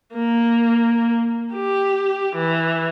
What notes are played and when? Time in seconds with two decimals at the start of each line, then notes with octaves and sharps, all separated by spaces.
0.14 A#3
1.53 G4
2.35 E3